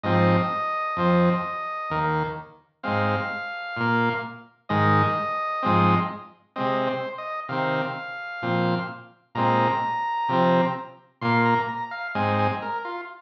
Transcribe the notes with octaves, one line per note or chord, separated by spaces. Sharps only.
G#2 F3 C4 D#5
F2 F3 C4
D#2 D#3 A#3
G#2 G#3 C4 F5
A#2 A#3
G#2 D#3 G#3 D#5
G#2 F3 G#3 C4
C3 G#3 C4 D#5
C5
D#5
C3 D#3 C4 F5
A#2 F3 C4
A#2 G#3 C4 A#5
C3 F3 C4
A#2 A#3 C6
A#5
A#5
F5
G#2 G#3 C4 G#5
G#5
A#4
F4